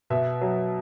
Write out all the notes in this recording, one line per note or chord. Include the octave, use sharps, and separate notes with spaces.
B2 E5
F#3